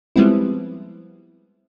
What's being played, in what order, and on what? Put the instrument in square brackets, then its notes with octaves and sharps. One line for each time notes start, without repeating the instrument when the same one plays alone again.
[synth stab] F3 G3 G#3 B3 C4 E4